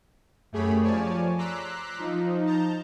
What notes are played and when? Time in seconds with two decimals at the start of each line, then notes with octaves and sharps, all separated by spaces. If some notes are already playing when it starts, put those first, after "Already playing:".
0.52 F#2 A3 G4 G#4 C#5 B5
0.82 F3 C#5 D5 G#5 A5
1.38 A#5 C6 D6 E6 F#6 B6
1.98 F3 D#4
2.46 A5 A#5 G6